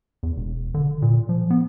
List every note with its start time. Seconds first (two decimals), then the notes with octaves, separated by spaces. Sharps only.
0.23 E2
0.36 E1
0.74 D3
1.02 A#2
1.29 F3
1.50 B3